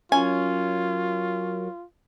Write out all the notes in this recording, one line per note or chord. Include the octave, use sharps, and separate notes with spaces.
F#3 C#4 F4 F#4 A#4 G#5